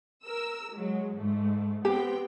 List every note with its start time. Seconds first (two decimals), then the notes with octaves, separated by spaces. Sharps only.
0.24 A#4 E6
0.76 F#3 G#3
1.16 G#2 A3
1.85 B3 C4 G4 G5